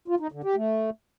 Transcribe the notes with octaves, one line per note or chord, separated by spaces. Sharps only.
F4
D#4
D3
G4
A3